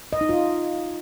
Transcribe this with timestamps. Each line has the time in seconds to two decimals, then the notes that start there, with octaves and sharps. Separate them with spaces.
0.13 D#5
0.21 D#4
0.29 F4